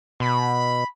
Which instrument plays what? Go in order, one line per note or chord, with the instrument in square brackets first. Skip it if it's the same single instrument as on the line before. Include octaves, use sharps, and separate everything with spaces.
[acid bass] B2 [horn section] B5